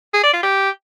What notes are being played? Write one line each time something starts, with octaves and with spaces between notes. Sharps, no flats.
G#4
D5
F4
G4